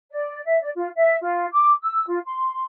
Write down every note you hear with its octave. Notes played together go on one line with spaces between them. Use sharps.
D5
E5
D5
F4
E5
F4
D6
E6
F4
C6